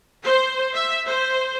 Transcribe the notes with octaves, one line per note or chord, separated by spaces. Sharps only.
C5
E5
C5